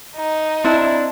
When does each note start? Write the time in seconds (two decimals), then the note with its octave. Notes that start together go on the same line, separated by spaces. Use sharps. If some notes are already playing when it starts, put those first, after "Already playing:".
0.16 D#4
0.64 C4 D4 E4 D#5 C6